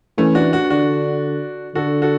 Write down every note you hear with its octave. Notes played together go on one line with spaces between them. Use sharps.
E3 A3 C#4
D4 F#4
D4 F#4
D3 D4 F#4
D3 F#4 A4
F#4 A4